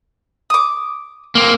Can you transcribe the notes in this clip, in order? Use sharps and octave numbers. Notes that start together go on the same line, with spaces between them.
D6 D#6
A#3 C4